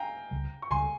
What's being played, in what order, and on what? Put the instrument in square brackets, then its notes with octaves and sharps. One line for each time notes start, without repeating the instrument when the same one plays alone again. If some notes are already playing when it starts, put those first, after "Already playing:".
Already playing: [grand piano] F5 G5 G#5 A#5
[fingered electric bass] C#2 C#3 G3
[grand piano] C#6
[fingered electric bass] C#2 C#3 G3 [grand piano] G#5 C6